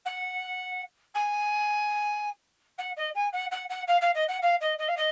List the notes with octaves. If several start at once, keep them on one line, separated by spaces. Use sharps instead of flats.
F#5
G#5
F#5
D#5
G#5
F#5
F#5
F#5
F5
F5
D#5
F#5
F5
D#5
D#5
F5
D#5